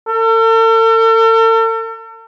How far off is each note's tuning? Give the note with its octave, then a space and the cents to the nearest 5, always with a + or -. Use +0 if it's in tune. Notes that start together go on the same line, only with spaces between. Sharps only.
A4 +45